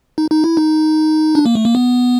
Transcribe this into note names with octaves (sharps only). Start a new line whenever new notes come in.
D#4
D#4
E4
D#4
D4
A#3
A3
A#3
B3